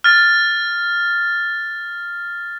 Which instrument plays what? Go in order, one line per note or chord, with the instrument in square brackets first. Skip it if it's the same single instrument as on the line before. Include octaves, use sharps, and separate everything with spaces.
[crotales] F6 A6